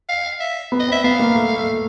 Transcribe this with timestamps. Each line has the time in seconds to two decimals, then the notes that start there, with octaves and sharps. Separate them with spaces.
0.09 F5
0.40 E5
0.72 B3
0.80 D#5
0.88 C4 E5
1.04 B3 F5
1.19 A#3
1.35 A3
1.56 A3